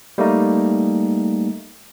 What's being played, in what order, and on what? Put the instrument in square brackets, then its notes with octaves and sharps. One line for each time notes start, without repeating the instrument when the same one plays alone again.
[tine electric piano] G3 A3 A#3 D#4